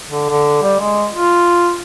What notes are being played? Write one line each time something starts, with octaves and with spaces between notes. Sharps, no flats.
D3
D3
G3
G#3
F4